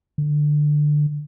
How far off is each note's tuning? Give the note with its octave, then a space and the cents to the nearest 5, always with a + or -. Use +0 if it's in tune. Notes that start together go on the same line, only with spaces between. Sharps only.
D3 +15